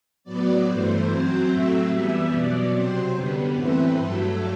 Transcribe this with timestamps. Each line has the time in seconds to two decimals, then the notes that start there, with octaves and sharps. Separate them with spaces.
0.24 A2 F#3 B3 D5
0.65 G2 E3 A3 C5
1.07 F#2 F#3 C4 C5
1.47 A2 F#3 A3 C4 E5
1.89 F#2 E3 G3 B3 E5
2.31 B2 F#3 B3 D5
2.72 C3 F#3 C4 C5
3.13 F#2 D3 G3 B3
3.54 A2 E3 A3 C4 B4
3.95 G2 F#3 A3 A4